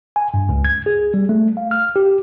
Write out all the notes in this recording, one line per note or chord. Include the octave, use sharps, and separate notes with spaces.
G#5
G2
C#2
G#6
G#4
G3
A3
F5
F6
G4